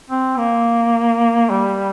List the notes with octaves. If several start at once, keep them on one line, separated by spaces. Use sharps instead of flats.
C4
A#3
G3